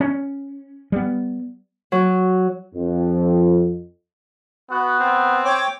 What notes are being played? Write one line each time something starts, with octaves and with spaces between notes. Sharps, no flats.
C#4
G3 B3
F#3
F2
B3 F#4
C4
C#5 G5 D6